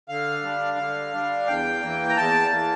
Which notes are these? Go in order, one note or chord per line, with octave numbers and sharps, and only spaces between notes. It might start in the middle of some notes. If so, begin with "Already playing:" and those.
D3 F5
G3 D4
D3
G3 D4
E2 G5
E3 A#3
A#5
E2 A5
E3 A#3